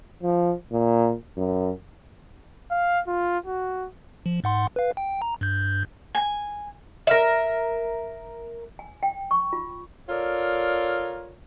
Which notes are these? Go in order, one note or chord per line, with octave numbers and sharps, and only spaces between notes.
F3
A#2
F#2
F5
F4
F#4
F3
G#2 F#5 C6
B4 F5
G5
A#5
G2 G6
G#5
A#4 E5
G#5
G5
C#6
F4
F4 A4 A#4 C#5 D5